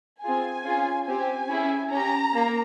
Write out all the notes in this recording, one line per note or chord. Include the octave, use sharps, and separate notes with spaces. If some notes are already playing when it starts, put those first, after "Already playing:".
C4 F4 G#4 G#5
C#4 F4 G#4
C4 G4 G#5
C#4 E4 G#4
C#4 G4 A#5
A#3